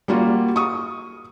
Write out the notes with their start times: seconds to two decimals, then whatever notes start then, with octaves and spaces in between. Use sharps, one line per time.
0.08 G3 A#3 F4 F#4
0.56 C#6 D#6